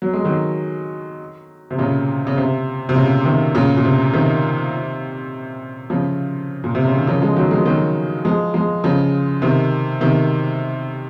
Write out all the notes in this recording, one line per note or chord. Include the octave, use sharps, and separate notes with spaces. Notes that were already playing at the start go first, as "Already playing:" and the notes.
F#3
G#3
D#3 F#3
C3
A#2 C#3
C#3
C3
C3
A#2 C#3
C3 D#3
A#2 C#3
A#2
C3
C3 D#3
C#3 F3
A#2
C3
C#3
D#3
C#3 F3
F3 G#3
D#3 F#3
F3 G#3
D#3 F#3
F3 G#3
F3 G#3
C#3 F3
C3 D#3
C3 D#3